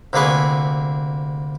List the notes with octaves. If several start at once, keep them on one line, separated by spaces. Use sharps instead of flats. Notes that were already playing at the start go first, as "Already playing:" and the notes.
D2 C3 A#3 G#4 B4 C#6